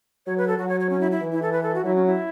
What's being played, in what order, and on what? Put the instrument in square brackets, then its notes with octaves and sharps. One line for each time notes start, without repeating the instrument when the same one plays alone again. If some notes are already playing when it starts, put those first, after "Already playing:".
[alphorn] F#3 [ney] C#5
[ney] B4
A4
[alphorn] F#3 [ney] F#4
[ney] C#5
C#5
C#4
E4
E4
[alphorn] E3
[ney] E4
A4
B4
A4
F#4
[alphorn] F#3 [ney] E4
[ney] C#4
E4